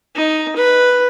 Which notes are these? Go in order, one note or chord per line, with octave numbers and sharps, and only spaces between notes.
D#4
B4